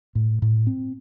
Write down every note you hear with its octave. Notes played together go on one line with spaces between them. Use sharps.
A2
A2
C4